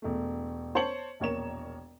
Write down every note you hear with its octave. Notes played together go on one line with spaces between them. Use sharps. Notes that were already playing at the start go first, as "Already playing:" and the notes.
E1 A3
C5 C#5 A5 C#7 F#7
E1 A#1 A#4 C#5 A#5 E7